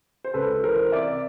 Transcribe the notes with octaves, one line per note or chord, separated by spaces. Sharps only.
C5
C#2 A4 B4
E3 A#4 C5
C3 D5 E5